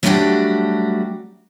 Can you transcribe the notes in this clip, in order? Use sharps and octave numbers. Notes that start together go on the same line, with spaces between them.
F#3 G3 A3 D4 F#4 G4